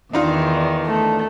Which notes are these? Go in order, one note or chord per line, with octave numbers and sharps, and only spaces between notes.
E2 D#3 D4 D#4 F4
A3